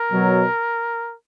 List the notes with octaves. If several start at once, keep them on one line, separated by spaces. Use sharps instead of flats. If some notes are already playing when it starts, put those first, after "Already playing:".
Already playing: A#4
B2 F#3